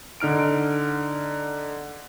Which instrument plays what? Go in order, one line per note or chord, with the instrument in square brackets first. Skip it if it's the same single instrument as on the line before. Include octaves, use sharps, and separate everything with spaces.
[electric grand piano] D3 D#4 F6 D7